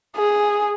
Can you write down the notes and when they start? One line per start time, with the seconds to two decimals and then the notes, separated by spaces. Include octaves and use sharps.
0.17 G#4